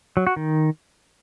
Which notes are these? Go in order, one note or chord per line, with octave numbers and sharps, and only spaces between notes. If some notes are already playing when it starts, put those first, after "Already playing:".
F#3
F#4
D#3